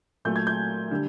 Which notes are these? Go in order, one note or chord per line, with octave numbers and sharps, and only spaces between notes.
A#2 F#3 A3 G6
G#6
G6
D3 G3